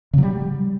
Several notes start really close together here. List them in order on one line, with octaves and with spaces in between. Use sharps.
C#3 F#3 G3